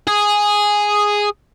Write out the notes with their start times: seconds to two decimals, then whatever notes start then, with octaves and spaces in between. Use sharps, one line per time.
0.08 G#4